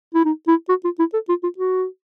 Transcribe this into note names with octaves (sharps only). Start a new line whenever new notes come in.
E4
D#4
E4
F#4
F4
E4
A4
F4
F4
F#4